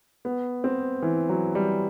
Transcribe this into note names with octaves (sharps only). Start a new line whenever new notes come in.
B3
C4
E3
F#3
G3